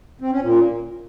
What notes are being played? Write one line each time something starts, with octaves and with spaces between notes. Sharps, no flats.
C4
C#4
A#2